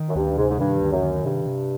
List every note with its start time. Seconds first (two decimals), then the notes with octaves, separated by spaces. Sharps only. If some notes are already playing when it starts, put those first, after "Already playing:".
Already playing: D#3
0.09 F#2
0.15 D2 G2
0.37 G#2 C3
0.50 G#2
0.59 G2 D#3
0.81 D2
0.92 F#2
1.02 D#3
1.24 G2 C3
1.46 C3